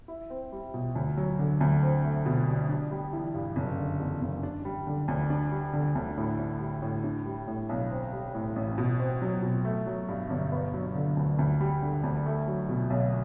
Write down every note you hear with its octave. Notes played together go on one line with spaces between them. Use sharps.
E4
C4
G3
B2
D2
F#3
D3
D2
C4
A3
B2
C2
D4
G3
E3
G2
F#1
D3
E2
F#1
D4
G3
D3
D2
D4
G3
D3
D2
A2
D4
G3
A2
D4
G3
A2
B1
C4
G3
A2
A1
B2
C4
F#3
B2
A3
F#3
G2
G1
B3
F#3
D3
D2
D2
G3
D3
D2
A3
F#3
B2
B1